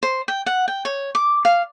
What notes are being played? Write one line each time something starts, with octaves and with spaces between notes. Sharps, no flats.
C5
G5
F#5
G5
C#5
D6
F5